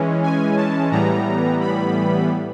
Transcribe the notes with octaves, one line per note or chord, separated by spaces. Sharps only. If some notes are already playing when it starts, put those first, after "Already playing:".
Already playing: E3 G#3 C#4
G#5
A5
A2 E3 G3 B3 A#5
B5